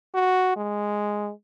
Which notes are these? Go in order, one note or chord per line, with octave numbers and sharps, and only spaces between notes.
F#4
G#3